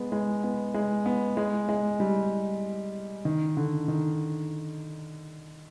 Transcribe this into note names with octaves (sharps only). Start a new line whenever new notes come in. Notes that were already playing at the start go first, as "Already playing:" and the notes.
Already playing: G#3 B3
G#3
B3
G#3
B3
G#3
G#3
G3
D#3
D3
D#3